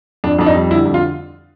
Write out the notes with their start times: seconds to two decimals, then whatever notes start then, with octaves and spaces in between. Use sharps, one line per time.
0.24 F2 D4
0.39 F2 D4
0.46 D#4
0.55 G3
0.71 D3 E4
0.85 F2
0.94 F4